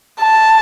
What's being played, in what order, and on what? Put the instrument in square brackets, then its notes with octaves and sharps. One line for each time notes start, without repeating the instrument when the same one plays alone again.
[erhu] A5